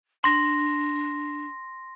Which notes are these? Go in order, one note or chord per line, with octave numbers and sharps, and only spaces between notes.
D4 C6 A#6